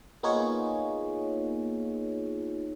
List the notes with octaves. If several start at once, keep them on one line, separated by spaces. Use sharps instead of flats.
A#3 B3 D#4 F4 G#4 C#5